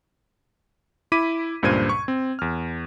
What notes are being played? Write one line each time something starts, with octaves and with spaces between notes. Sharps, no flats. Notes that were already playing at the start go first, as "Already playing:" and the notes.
E4 B5 D6 B6 D#7
C#2 G2 A#2 C5 G#6 D#7
C#6
C4
E2 F6